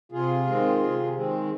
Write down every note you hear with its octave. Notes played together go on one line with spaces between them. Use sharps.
C3 F4 G#4
D#3 G#3 C4
C3
D#3 G#3 C4